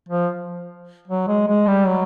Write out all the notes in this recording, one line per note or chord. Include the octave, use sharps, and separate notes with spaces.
F3
F#3
G#3
G#3
G3
F#3